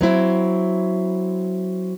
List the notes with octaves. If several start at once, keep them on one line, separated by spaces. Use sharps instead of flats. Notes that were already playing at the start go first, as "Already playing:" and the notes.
F#3 C4 E4